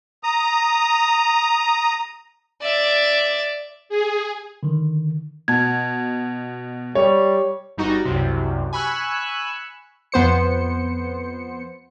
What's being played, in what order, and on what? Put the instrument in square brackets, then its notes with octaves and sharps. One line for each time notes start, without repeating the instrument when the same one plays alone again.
[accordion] A#5 D#6
[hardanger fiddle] D5 E5
[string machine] G#4
[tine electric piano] D3 D#3
[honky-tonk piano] B2 [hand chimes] A5 G#6
[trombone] G3 [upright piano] C#5
[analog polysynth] G1 G3 D#4 F#4
C2 F#2 C3
G#5 B5 C#6 E6 F#6
[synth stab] F2 B3 C5 C#7